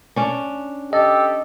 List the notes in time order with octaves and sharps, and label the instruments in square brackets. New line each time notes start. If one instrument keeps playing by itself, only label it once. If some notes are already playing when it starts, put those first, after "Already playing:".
[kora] C#4 D4
[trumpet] G4 [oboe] A4 [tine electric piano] D#5